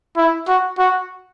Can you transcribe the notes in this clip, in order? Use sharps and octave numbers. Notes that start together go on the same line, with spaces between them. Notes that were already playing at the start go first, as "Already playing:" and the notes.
E4
F#4
F#4